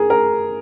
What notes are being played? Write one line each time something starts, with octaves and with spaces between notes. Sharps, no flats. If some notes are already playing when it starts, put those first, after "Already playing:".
Already playing: G#4 A#4
A#4